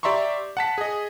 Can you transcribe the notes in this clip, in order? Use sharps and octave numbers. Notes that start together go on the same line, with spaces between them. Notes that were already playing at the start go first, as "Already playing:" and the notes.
G4 D5 E5 A#5 C6 C#6
F#5 A5 B6
G#4 D#5